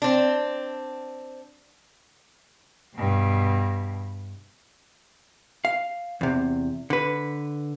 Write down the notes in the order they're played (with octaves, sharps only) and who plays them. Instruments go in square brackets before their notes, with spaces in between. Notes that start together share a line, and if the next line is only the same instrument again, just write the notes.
[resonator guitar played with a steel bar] C4 D4
[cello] G2 B2
[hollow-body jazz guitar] F5
E2 C3
D3 B4